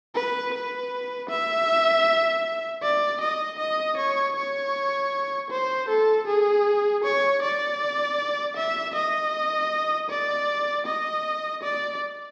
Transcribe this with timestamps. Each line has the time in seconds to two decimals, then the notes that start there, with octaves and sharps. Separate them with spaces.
0.15 B4
0.53 B4
1.29 E5
2.83 D5
3.21 D#5
3.59 D#5
3.98 C#5
4.36 C#5
5.50 C5
5.89 A4
6.27 G#4
7.04 C#5
7.42 D5
8.57 E5
8.95 D#5
10.10 D5
10.86 D#5
11.63 D5